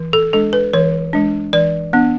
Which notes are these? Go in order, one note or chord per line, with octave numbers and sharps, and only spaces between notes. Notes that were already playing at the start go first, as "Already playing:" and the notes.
Already playing: E3
A4
G#3 D4 A4
B4
E3 C#5
G#3 D4
E3 D5
B3 D4